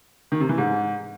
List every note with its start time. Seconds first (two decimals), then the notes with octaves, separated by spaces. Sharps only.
0.32 D#3
0.40 C3
0.49 E3
0.58 G#2